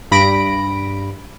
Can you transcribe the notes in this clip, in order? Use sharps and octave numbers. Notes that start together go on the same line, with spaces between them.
G2 B5 A#6 D7